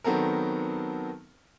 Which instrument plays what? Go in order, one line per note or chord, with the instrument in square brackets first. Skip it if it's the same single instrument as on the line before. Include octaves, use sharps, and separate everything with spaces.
[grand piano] D#3 F#3 B3 C4 A4 A#4